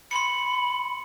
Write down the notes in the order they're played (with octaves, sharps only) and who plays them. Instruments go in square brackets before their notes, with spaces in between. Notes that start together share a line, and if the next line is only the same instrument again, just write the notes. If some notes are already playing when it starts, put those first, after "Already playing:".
[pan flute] B5 [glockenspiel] C6 C#7